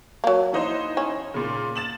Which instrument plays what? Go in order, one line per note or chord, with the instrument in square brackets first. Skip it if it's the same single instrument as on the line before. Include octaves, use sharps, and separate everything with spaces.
[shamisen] F#3 A#3
[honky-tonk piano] E3 D#4 C5
[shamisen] C#4
[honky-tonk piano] A#2 C#3
A6 E7 F#7